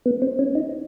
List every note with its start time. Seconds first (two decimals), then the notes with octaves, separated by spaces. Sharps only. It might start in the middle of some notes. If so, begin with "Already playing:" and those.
0.06 B3
0.22 C4
0.39 C#4
0.55 D#4